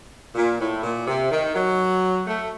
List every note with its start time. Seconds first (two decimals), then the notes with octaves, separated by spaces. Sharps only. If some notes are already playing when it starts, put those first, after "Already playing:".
0.35 A#2
0.59 A2
0.84 A#2
1.07 C3
1.31 D#3
1.55 F#3
2.27 A3